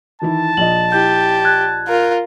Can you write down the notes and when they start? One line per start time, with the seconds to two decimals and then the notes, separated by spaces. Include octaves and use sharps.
0.22 D#3 E3 E4 A5
0.57 A#1 D#5 F#7
0.92 E4 G4 G6
1.45 F#6 G#6
1.88 F4 A#4